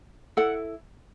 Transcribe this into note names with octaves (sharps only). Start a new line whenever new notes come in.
E4 A4 F#5